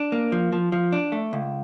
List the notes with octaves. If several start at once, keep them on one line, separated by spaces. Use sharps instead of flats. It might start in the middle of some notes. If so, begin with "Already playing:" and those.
Already playing: D4
A#3
F3
F3
F3
D4
A3
C#2